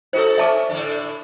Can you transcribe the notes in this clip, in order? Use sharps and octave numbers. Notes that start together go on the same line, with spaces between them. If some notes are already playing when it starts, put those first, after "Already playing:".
D#4 F#4 A4 C5
C#4 D4 E5 A5 D6
A2 D3 D4